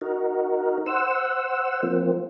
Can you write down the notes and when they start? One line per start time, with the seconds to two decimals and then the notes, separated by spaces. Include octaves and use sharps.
0.01 D#4 F#4 A#4
0.86 C5 F#5 E6
1.83 F3 A#3 C4